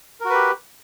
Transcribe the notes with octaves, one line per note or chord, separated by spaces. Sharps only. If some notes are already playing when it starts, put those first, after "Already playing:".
F#4 G4 A#4 B4